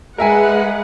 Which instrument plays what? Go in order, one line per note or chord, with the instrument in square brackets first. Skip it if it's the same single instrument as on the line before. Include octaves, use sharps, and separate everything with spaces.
[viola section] G#3 B4 F#5 [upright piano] A#4 E5 G#5